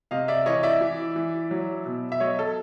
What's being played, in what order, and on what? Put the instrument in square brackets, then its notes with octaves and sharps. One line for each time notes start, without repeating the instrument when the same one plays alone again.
[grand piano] C3 D#5 F5
D5 E5
E3 C#5 D#5
D5 E5
E3
E3
F#3
B2
E5
F#3 C#5 D#5
A4